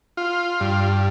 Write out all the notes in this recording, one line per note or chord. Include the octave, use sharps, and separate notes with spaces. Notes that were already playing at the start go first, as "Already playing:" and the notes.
F4
G2